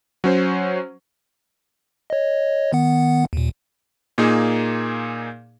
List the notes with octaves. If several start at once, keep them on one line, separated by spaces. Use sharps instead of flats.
F#3 C#4 C5
C#5 D#5
D#3 B3 F#5
D#2 A#2
A#2 A#3 D#4 G#4